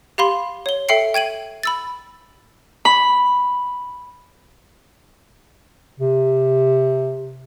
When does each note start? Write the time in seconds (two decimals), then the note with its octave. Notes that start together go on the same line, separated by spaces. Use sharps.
0.18 G4 F5 B5 C6
0.66 C#5 G7
0.89 A4 E5 G5 C7 C#7
1.14 G5 G#6 D#7 F#7
1.63 B5 E6 A6
2.85 B5
6.00 C3